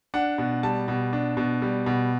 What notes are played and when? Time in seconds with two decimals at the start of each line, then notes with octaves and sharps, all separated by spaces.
0.14 D4 F#5
0.38 B2
0.63 G3 A5
0.88 B2
1.13 D4
1.37 B2
1.62 G3
1.86 B2